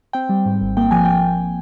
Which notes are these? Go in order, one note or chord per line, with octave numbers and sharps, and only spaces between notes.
C4 G5
G3
G#2
G#1
A#3 G5
F3 G#5
G5